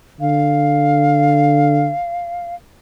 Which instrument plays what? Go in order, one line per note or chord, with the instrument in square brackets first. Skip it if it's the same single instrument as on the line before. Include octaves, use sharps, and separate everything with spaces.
[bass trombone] D3 [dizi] F5